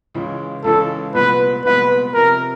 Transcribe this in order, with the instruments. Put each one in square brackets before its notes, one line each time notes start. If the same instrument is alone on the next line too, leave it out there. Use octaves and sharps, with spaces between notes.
[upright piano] C#2 C#3 E3 G#3
[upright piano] C#2 C#3 E3 G#3 [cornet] A4
[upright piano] C2 A#2 F3 G#3 B3 [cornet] B4
[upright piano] C2 A#2 F3 G#3 B3 [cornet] B4
[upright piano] F2 C3 F3 [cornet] A#4